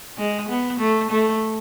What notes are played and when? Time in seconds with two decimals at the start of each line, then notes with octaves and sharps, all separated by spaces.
0.17 G#3
0.49 B3
0.79 A3
1.11 A3